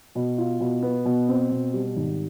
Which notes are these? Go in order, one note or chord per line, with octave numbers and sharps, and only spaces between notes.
B2
F4
B2
B3
B2
C4
B2
G3
G#1